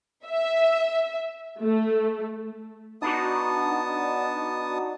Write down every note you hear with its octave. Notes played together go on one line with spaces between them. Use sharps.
E5
A3
B3 D4 D#4 F#4 A5 D#6